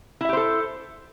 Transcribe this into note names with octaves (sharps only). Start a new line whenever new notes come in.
E4 G4 A4 C5 E5